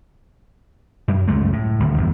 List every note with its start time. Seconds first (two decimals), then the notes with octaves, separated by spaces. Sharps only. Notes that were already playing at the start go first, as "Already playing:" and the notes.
1.08 F#2
1.28 C#2 F#2 G#3 A3
1.53 A2
1.80 D#1 D2
1.97 G1 E2